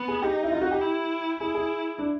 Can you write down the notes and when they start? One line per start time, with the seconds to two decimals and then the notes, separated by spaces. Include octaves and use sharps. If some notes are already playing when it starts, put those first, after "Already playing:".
Already playing: B3
0.08 G#4
0.22 D#4 G4
0.43 E4
0.52 F4
0.62 F#4
0.71 G4
0.81 E4
1.40 E4 G#4
1.55 G#4
1.99 D4